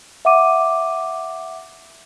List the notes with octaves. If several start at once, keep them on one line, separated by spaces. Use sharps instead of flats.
E5 F#5 D6 D#7